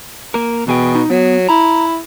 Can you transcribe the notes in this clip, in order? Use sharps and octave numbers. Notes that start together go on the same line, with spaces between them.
A#3 A#4
E2 B2 G#4 G5
D#4
F#3 B3
E4 A#5